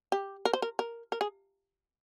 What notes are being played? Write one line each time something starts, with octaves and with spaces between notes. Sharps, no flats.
G4
A#4
C5
A#4
A#4
A#4
G#4